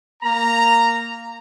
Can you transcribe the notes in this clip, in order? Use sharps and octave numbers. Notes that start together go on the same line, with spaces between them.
A#3 A#5